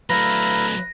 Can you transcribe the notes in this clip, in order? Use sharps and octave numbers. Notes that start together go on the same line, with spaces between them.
F#3 A3 E4 B4 F5 A#5 A#6